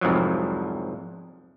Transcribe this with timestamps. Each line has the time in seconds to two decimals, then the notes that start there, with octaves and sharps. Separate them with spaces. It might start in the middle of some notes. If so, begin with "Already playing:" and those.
0.01 C2 F2 G#2 F3 F#3